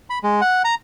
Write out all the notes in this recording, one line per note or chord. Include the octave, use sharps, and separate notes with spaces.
B5
G#3
F#5
A#5